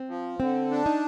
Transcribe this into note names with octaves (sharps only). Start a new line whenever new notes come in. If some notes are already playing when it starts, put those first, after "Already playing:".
Already playing: C4
F3
D3 C4
D4
D#4